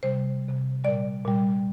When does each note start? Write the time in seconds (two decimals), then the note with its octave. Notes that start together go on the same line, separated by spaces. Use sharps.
0.03 C3 G3 C5
0.43 C3 G3
0.84 A#2 G3 D5
1.25 A#2 G3